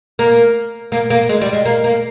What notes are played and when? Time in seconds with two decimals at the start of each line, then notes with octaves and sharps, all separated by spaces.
0.19 A#3
0.92 A#3
1.10 A#3
1.29 G#3
1.41 G3
1.53 G#3
1.66 A#3
1.84 A#3